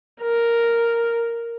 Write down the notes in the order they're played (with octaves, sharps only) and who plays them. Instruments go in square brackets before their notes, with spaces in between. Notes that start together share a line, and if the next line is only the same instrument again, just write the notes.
[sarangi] A#4